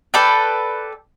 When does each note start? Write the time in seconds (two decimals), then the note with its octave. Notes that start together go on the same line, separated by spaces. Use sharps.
0.14 A4 B4 D5 G5